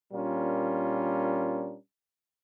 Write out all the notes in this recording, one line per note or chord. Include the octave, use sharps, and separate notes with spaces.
A#2 G3 C#4 D4 F4 A#4